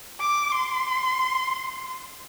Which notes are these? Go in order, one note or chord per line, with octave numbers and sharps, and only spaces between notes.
D6
C6